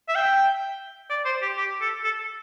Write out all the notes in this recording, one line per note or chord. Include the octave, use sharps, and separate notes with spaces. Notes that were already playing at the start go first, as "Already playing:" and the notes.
E5
G5
D5
C5
G4
G4
A4
A4